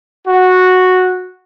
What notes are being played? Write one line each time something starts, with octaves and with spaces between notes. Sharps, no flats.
F#4